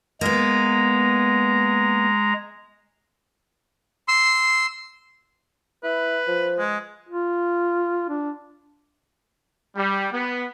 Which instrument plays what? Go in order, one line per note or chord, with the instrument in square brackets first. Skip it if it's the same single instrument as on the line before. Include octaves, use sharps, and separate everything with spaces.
[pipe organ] G#3 A#5 [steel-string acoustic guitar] A#3 B3
[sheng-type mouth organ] C6 E6
[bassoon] E4 [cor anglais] B4
[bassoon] F3
[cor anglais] G#3
[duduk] F4
D4
[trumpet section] G3
B3